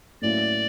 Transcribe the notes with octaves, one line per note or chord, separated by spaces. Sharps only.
A2 F#3 A#3 C#4 E4 D5